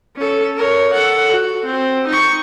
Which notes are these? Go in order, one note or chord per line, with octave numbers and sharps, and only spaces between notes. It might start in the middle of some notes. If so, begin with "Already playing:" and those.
C#4 A4
A#4 C#5
A4 F#5
F#4
C4
D#4 C#6